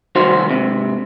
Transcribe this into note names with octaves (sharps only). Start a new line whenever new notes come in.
C2 D#3 F#3 F#4 C5
G#2 C3